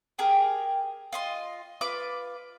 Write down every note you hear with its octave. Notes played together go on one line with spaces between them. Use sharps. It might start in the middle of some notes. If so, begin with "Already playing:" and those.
G4 G#4 A#4
F4 D#5 C6
F4 B4 D6